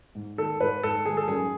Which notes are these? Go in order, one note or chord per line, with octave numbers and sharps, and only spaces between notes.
G#2
D#3 A4
G#2 B4
G#2 A4
D#3 G#4
A4
F#2 G#4